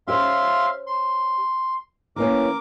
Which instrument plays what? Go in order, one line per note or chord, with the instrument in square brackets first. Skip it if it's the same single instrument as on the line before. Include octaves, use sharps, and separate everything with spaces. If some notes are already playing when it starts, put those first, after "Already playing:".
[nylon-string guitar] C#4 G4 C5 [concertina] E5 F5 C6
[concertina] C6
[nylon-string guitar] E3 A#3 C#4 [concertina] A#4 D6